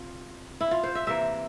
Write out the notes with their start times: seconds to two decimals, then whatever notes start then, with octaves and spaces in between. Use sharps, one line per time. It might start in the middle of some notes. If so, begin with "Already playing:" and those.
Already playing: C3 F4
0.61 E4
0.71 F4
0.83 C5
0.95 E5
1.07 C3 E3 A#3 E5